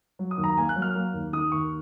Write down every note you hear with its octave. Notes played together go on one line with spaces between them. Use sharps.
F#3
D#6
D#2
A#5
A#3 G#5
F#6
F#3
F6
A#3
D#2
D#3 D#6
D#2 C#6